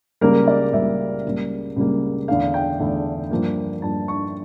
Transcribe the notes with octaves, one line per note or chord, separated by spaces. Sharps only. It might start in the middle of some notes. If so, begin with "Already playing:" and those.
C#2 C#3 G3 A#3 A#4
D5
C#2 C#3 G3 A#3 E5
C#2 C#3 G3 A#3
C#2 C#3 G3 A#3
E2 D3 A3 F5
G5
E2 D3 A3
G2 F3 A#3
G2 F3 A#3 A5
C#6